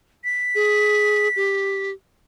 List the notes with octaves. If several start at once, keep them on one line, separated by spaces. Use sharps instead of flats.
B6
G#4
G4